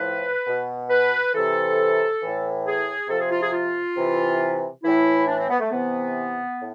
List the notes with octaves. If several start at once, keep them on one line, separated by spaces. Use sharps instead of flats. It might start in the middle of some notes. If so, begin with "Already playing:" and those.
Already playing: A2 F3 B4
B2
B4
C3 E3 A4
A2 E3
G#4
C3 F3 A4
G#4
F4
G#4
F4
C3 E3
A2 E3 E4
D4
C4
B3
A3
C3 E3 B3
A2